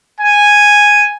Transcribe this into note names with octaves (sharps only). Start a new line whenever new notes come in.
G#5